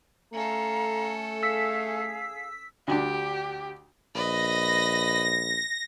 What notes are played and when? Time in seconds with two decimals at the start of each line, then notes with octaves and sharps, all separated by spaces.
0.33 A3 C#4 A4 F5 A#5
1.43 G#4 F5 E6 B6
2.88 D2 D4 G4
4.15 A#1 B4 D#5 A#6